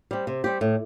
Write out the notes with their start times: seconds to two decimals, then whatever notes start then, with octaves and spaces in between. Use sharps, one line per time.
0.11 G3 C4 G4
0.27 C3
0.44 G3 C4 G4
0.61 A2